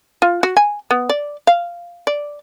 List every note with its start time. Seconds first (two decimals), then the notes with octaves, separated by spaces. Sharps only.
0.22 F4
0.43 F#4
0.57 G#5
0.91 B3
1.09 D5
1.47 F5
2.07 D5